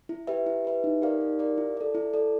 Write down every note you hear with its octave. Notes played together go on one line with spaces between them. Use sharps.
E4
G4 B4 E5
E4
G4 B4 E5
D#4
G4 A#4 D5 F5
D#4
G4 A#4 D5 F5
E4
A4 D5
E4
A4 D5